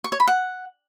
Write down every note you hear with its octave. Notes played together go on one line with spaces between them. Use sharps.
C#6
C#5
B5
F#5